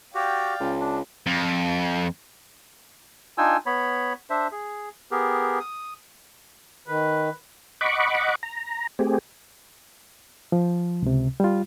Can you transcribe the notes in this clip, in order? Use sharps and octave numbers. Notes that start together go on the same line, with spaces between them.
F#4 G4 D5 F5 G5
C#2
D4
F2
D4 D#4 F4 G5 G#5 E6
B3 C#5 B5
D4 C5 E5
G#4
B3 G4 G#4 A#4
D#6
D#3 B4
D#5 F#5 B5 C#6 D6
A#5
A3 C4 G4 G#4
F3
C#2 C3
G3 F4